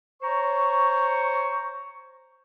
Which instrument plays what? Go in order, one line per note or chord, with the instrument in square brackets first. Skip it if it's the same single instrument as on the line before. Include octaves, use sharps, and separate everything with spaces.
[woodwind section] C5 C#5 A#5 C#6